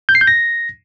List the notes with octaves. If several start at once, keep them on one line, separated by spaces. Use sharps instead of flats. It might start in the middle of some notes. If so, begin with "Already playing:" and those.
G6
C7
G6
A#6